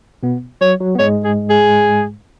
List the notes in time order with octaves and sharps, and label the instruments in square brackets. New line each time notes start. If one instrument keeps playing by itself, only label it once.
[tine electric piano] B2 B3
[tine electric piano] F#3 [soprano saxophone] C#5
[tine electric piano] F#3
B3
[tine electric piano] G#2 G#3 [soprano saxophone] C#5
[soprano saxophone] G#4
G#4